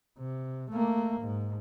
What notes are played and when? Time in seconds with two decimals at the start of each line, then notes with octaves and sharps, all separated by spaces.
0.18 C3
0.70 A3 A#3
1.21 G#2